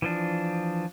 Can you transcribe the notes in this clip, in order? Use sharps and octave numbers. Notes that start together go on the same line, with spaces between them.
E3 F3 D4